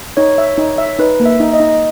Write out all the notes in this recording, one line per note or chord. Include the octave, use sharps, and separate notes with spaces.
D#4 C#5
E5
D#4
E5
D#4 B4
A#3
E5
D#4
D#5
D#4